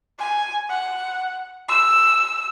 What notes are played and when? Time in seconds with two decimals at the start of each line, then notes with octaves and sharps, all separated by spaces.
0.18 G#5
0.70 F#5
1.68 E6